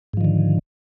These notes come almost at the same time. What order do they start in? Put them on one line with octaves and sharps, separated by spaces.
G#2 F3 D#3 D3